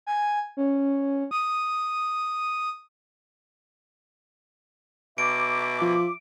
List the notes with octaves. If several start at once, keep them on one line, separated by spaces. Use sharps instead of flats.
G#5
C#4
D#6
B2 E5 D6 D7
F3